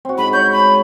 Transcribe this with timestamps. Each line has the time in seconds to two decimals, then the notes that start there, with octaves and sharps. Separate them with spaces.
0.05 C4 F#4
0.18 G#2 B5
0.33 C#5 G6
0.52 B5